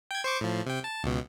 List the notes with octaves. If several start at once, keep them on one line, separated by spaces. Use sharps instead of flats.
G5 G#6
C5 C#6 D6
A2 F3
C3 G5
A5
C#2 B2